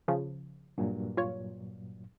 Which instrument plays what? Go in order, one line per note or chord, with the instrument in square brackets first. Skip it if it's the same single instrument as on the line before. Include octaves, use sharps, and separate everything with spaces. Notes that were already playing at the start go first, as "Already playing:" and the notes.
[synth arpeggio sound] C#3 F3
[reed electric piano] G2 A#2 F#3
[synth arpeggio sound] F4 C#5